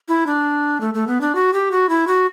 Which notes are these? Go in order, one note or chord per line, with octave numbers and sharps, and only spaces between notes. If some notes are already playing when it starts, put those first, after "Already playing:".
E4
D4
A3
A3
B3
D4
F#4
G4
F#4
E4
F#4